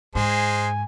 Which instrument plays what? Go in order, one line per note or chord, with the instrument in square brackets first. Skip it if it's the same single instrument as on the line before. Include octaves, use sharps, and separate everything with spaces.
[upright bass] G#2 [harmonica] G#3 C5 [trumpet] G#5